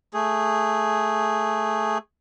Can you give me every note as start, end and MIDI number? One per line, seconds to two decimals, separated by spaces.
0.14 1.98 57
0.14 1.98 68